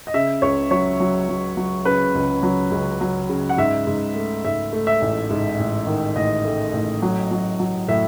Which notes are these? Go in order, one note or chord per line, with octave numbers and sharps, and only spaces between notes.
D#5
C#3 E5
C#2 C#5
F#3 C#5
F#3
F#3
F#3
C#3 B4
C#2
F#3
C#2
F#3
C#3
F#5
G#2 E5
G#2
A3
G#2 E5
A3
E5
A1
G#2
A1
D#3
A1 D#5
A3
A1
F#3
F#3
F#3
A2 E5